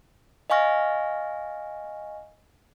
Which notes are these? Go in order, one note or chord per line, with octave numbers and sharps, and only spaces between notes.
D#5 F5 G#5 C#6 F6 A#6